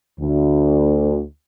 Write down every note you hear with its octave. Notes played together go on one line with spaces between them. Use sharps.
D2